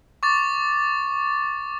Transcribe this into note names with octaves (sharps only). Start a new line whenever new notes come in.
C#6 D6 A6